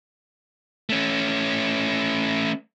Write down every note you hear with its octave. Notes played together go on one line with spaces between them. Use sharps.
A3 C#4